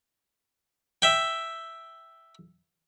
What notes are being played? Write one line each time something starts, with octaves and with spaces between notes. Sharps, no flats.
E5 G5